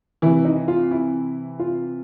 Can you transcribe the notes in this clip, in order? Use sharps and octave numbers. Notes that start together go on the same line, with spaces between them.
C3 E3 E4
D#4
F4
E4
F4